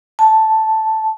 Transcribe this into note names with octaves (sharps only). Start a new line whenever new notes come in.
A5